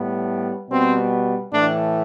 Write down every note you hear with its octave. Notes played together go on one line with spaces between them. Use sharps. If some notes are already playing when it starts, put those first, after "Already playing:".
Already playing: A2 G3 B3
B2 G3 B3 C4
A2 E3 A3 D4